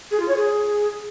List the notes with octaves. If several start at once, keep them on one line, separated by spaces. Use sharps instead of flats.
G#4
F4
C#5
G#4